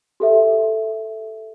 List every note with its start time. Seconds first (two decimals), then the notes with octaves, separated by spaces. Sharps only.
0.20 G4 A4 E5